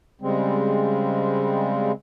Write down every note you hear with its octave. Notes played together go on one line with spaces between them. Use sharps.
C#3 G3 G#3 C4